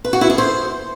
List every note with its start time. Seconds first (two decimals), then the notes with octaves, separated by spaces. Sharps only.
0.04 B4
0.13 F#4
0.21 E4
0.30 G#4
0.38 C5